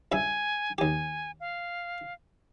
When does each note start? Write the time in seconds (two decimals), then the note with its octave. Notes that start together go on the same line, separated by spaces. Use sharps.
0.12 C#2 G2 E5 G#5
0.78 D#2 G4 G#5
1.40 F5